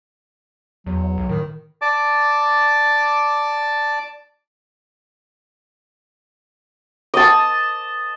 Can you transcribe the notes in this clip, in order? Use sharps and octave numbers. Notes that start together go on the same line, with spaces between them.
E2 F#3
B1
A2 D#3
D5 A5 D6
D#5 A5